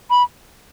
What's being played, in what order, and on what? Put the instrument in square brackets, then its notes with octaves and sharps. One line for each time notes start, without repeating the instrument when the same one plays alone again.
[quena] B5